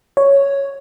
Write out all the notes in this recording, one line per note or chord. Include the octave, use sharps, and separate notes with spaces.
C#5